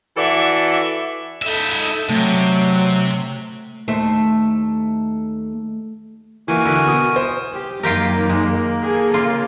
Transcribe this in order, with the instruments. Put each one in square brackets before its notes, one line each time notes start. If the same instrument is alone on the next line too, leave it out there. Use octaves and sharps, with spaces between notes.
[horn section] E3 F#4 A4 D5 E5
[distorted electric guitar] D#4 E5 [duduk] A4
[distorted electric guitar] C3 [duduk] F#3 [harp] A3
[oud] D#2 A3 C5
[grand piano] E3 A#3 [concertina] F#4 A#4 G#5
[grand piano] D3 E3
B2 D#6
C5
[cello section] G4
[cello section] F#2 D#3 [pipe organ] A#3 [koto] F4 G4 A#4
[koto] G#3
[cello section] G#4 A4
[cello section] C#3 [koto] F4